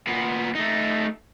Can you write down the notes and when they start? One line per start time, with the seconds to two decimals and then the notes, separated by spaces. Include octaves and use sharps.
0.07 A#2 B3
0.55 A3 D#4